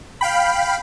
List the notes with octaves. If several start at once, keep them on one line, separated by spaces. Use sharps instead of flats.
F5 G5 B5